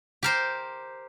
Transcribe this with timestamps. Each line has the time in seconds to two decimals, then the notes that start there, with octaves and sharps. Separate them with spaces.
0.23 G4 A#4 C5